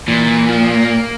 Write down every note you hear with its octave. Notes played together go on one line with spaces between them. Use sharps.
A#2 E3
E3
F3
A#3